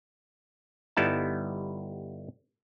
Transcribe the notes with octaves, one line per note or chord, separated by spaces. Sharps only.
G1 G3 B3 D#4 E4 A5